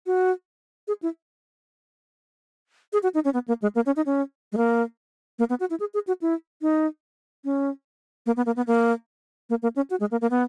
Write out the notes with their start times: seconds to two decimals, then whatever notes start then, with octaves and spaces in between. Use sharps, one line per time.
0.07 F#4
0.88 G#4
1.03 E4
2.93 G#4
3.03 F#4
3.14 D#4
3.25 C#4
3.34 B3
3.48 A#3
3.62 G#3
3.75 A#3
3.86 C#4
3.96 D#4
4.06 C#4
4.52 G#3
4.57 A#3
5.39 A#3
5.50 B3
5.60 F#4
5.70 E4
5.80 G#4
5.94 G#4
6.07 F#4
6.22 E4
6.62 D#4
7.45 C#4
8.26 A#3
8.37 B3
8.46 A#3
8.56 B3
8.67 A#3
9.50 A#3
9.63 A#3
9.76 C#4
9.90 F#4
10.00 G#3
10.11 A#3
10.21 A#3
10.31 B3